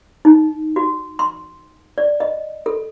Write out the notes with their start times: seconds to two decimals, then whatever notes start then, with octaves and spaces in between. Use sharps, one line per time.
0.25 D#4
0.76 F#4
1.19 C6
1.98 D5
2.20 D#5
2.66 A4